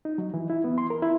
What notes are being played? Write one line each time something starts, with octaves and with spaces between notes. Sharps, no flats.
D#4
F#3
E3
E4
B3
C6
A#4
E4